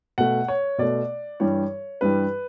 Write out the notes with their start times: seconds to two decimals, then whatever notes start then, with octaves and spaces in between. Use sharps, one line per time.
0.18 B2 A3 F#5
0.48 C#5
0.78 B2 A3 D5
1.40 G2 E3 G3 C#5
2.01 G2 E3 G3 B4